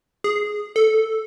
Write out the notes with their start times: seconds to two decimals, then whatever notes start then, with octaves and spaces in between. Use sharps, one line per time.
0.24 G#4
0.76 A4